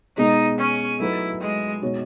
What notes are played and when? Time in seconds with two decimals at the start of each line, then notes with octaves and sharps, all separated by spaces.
0.17 B2 G#3 B3 D#4
0.58 C#4
1.00 F#3 A3 D#4 E4 F#4 B4
1.41 G#3
1.82 B2 G#3 D#4 F#4 C#5